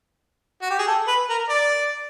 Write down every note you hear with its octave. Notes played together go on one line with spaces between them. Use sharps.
F#4
G4
G#4
A4
B4
A#4
D5